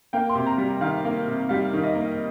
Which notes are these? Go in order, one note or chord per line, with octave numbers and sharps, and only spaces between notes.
A#3 G5
C6
C3
A#5
G3
D#3 F5
A#3
C3
G3 F5
D#3
D#5
A#3